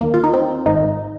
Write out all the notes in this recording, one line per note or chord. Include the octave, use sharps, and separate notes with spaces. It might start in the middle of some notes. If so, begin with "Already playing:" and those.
D#2 D#3 A#3
F4
D#4
C4
G#1 G#2 D#3 D#4